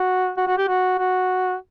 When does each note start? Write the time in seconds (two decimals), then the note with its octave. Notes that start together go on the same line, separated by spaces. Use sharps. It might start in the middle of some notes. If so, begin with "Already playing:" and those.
Already playing: F#4
0.37 F#4
0.47 F#4
0.58 G4
0.68 F#4
0.99 F#4